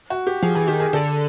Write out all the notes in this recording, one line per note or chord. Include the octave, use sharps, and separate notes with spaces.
F#4
G4
F3 G#4
E3 G#4
D#3 G4
G#4
D3 A4